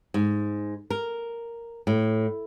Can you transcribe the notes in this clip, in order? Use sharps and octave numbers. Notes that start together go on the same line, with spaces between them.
G#2
A#4
A2